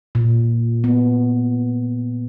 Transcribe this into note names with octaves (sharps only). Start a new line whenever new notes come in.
A#2
B3